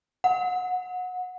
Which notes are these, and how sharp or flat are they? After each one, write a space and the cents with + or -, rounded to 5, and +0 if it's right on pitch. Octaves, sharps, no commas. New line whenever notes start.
F#5 -20